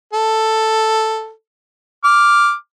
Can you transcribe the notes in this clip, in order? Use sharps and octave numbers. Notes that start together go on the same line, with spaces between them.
A4
D6 F6